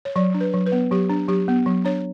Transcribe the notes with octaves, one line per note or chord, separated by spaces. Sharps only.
C#5
F#3 D5
D4
B4
F#3
B4
B3
F#3 G4
D4
F#3 G4
B3
F#3
D4 C#5